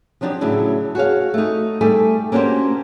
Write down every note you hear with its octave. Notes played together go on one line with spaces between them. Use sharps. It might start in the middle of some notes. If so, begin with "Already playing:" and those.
F3 F#3 D4 D#4 G4
A2 C#3 F#3 D4 E4
F#4 G#4 C#5 F5
A3 D#4
G3 A3 A4 E5 G#5
A#3 C#4 D4 F#4 G4 C5